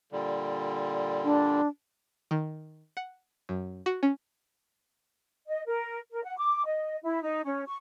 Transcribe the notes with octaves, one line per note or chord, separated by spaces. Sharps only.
A#2 D3 G3
D4
D#3
F#5
F#2
F#4
C#4
D#5
A#4
A#4
F#5
D6
D#5
E4
D#4
C#4
C#6